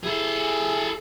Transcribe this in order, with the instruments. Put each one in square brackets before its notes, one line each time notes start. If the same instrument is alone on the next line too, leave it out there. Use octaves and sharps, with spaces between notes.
[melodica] E4 [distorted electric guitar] G#4 A4